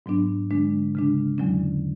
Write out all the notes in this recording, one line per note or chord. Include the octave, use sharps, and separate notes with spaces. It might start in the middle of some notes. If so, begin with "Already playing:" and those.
G#2 F#3 B3 D4
D3 G#3 D4
C#3 G#3 D4
E2 D3 F#3 C#4